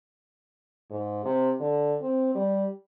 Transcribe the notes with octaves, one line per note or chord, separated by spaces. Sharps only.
G#2
C3
D3
C4
G3